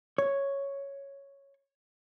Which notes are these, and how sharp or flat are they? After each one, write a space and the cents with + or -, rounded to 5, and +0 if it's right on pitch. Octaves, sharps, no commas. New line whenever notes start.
C#5 +0